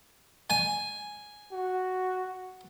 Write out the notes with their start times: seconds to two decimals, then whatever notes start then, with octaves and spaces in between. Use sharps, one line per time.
0.50 G#5
1.52 F#4